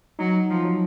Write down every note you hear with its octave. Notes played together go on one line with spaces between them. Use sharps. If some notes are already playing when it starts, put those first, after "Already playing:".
F#3 D#4
F3
F#3